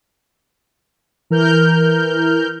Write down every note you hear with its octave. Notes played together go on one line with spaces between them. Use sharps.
E3 A#4 F6 G6